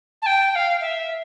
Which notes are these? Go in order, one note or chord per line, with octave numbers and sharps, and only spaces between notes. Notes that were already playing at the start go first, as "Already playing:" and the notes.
A5
G5
G5
F5
E5